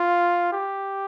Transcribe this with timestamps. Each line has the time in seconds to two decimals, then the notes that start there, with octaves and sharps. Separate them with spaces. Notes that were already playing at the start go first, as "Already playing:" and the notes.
Already playing: F4
0.53 G4